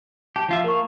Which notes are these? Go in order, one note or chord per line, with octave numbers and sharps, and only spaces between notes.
G4 A5
F3 F4 E5
A#3 A#4 C#6